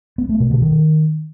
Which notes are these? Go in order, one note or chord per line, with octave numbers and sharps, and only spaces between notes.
B3
A3
B2
D3
D#3